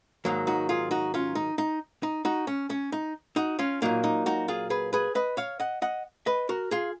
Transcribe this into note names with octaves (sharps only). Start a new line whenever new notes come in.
G#2 D#3 F#3 A#3
D#4 F#4
F4 G#4
D#4 F#4
C#4 F4
D#4
D#4
D#4
D#4 F#4
C#4
C#4
D#4
D#4 F#4
C#4 F4
A#2 F#3 A#3 D#4
D#4
D#4 F#4
F4 G#4
G#4 B4
G#4 B4
B4 D#5
C#5 F5
D#5 F#5
D#5 F#5
B4 D#5
F#4 A#4
F4 G#4